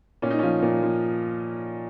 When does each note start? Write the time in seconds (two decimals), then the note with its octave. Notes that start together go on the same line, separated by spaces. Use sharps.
0.22 A#2 C#4
0.30 D#4
0.39 F3 C#4
0.62 A#2
0.83 F3